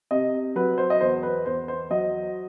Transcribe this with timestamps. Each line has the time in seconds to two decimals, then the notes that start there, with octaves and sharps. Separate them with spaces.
0.11 C3 D#5
0.56 F#3 B4
0.78 C5
0.90 D#5
1.01 E2 C5
1.23 B4
1.46 E2 C5
1.68 C5
1.90 F#3 D#5